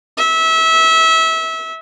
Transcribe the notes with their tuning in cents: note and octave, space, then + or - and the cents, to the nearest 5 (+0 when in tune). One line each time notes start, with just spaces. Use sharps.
E5 -25